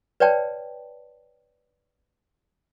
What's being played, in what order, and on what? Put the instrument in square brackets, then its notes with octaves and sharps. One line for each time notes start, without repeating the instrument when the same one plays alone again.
[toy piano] B4 C#5 D5 G5 A5